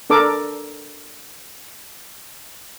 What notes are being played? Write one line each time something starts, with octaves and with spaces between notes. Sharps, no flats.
D4 A4 A#4 D6